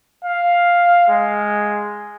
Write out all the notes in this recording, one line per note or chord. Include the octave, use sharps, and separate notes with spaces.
F5
G#3